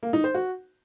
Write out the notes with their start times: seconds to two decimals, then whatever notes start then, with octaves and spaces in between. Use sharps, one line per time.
0.03 A#3
0.13 D#4
0.24 C5
0.35 F#4